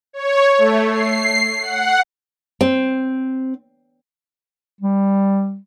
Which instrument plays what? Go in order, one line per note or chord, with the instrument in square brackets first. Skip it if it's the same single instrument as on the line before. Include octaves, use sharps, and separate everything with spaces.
[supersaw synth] C#5
A3
C7
F#5
[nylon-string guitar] C4
[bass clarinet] G3